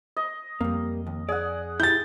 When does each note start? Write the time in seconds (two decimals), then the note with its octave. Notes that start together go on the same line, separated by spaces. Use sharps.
0.17 D#5
0.61 F2 G3 A#3
1.07 D#2
1.29 G#4 D5 F#5
1.80 E4 G4 G6 A6